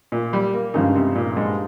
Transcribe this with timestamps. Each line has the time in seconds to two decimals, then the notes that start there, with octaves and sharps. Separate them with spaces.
0.12 A#2
0.33 G3
0.54 A#3
0.74 G2 C#3 F3 G#3 D#4 G#4
0.95 C3
1.15 A#2
1.36 G#2